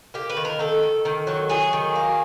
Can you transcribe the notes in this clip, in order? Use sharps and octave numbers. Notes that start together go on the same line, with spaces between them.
A#3 G4
B4
D#3
A#4
D#3 A4
D#3
D#3
F#3
F#3 G#4
D#3
A#3